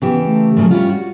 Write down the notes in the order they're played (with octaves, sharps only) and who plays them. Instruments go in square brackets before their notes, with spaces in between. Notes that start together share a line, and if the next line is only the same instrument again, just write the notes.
[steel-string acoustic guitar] C#3 E3 G4 [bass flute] B3
[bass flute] A3
[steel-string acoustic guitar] A#2 C#3 F#3
[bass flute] G3 [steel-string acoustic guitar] C#4 E4 F4
[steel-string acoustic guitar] F#4